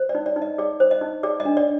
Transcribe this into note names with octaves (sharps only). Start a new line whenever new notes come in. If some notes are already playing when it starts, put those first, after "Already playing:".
Already playing: C5
D5
D#4
D5
D#4
D#5
G#4 D5
C5
D#5
D#4
G#4 D5
D#5
D4
D5